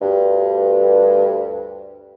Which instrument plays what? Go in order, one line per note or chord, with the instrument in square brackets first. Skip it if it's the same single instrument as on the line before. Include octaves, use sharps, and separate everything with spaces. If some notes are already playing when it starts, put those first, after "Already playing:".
[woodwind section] D2 G2